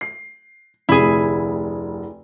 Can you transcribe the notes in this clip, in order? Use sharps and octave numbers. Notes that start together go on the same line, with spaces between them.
C7
F1 D2 C3 E4 G#4